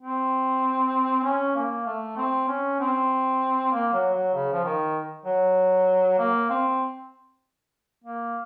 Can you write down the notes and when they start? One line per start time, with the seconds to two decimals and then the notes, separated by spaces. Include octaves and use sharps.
0.01 C4
1.24 C#4
1.55 A#3
1.87 A3
2.17 C4
2.49 C#4
2.80 C4
3.72 A#3
3.93 F#3
4.13 F#3
4.34 C#3
4.53 F3
4.65 D#3
5.26 F#3
6.19 A#3
6.50 C4
8.04 A#3